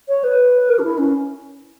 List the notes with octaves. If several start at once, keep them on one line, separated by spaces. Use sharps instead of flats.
C#5
B4
A#4
D4
E4
C#4